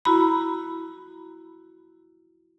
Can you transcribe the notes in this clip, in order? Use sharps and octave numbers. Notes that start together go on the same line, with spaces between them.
E4 F#4 A#5 B5